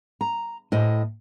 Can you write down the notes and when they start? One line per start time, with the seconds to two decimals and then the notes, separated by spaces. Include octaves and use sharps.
0.21 A#5
0.72 A2 C5 D#5